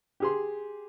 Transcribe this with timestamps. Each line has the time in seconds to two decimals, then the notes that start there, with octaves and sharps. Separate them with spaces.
0.20 G4 G#4 C6